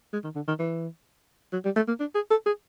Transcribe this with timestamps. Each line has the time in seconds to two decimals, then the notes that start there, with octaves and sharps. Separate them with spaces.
0.13 G#3
0.24 D#3
0.36 D3
0.48 D#3
0.59 E3
1.53 F#3
1.65 G3
1.76 A3
1.88 A#3
2.00 D4
2.15 G#4
2.31 A4
2.46 G#4